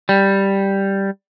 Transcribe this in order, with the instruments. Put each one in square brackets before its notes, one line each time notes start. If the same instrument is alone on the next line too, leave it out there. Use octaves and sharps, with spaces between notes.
[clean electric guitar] G3